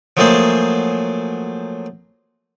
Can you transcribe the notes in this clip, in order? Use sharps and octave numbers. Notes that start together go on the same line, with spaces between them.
F3 F#3 A3 A#3 G#4 C5